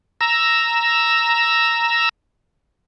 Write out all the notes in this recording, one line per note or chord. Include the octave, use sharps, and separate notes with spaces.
A#5 E6